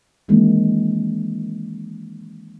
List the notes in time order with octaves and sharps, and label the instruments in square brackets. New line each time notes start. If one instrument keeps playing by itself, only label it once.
[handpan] D#3 E3 G#3 A#3 C4 D4